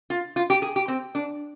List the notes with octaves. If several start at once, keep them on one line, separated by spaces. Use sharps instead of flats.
F4
F4
G4
G#4
G4
C4
D4